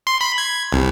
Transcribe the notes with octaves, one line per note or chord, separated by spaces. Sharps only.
C6
B5
G#6
C2